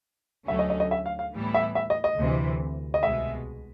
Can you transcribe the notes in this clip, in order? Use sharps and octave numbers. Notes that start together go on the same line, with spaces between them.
D2 D3 F#3 A3 C#4 E5
D#5
D#5
D#5
E5
F5
F5
A2 E3 G3 B3 E4
E5
E5
D#5
D#5
D2 C3 E3
D#5
C2 B2 G#3 E5